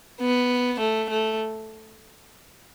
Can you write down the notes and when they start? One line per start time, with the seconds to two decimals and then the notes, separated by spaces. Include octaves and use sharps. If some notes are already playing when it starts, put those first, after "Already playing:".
0.21 B3
0.80 A3
1.10 A3